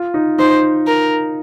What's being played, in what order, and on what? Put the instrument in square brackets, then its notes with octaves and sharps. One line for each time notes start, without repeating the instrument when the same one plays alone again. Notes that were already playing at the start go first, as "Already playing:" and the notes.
Already playing: [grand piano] F4
D#4
[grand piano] D#4 [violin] C5
[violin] A#4